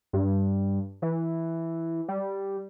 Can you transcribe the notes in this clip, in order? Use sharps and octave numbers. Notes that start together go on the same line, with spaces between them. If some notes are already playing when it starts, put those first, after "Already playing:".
G2
E3
G3